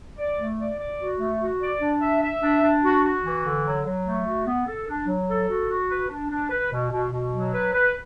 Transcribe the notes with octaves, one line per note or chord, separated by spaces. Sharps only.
D5
A3
D5
D5
F#4
A3
F#4
D5
D4
E5
E5
D4
D4
F#4
F#4
E3
D3
F#3
F#3
A3
F#4
B3
A4
D4
F#3
A4
F#4
F#4
B4
D4
D4
B4
B2
B2
B2
F#3
B4
B4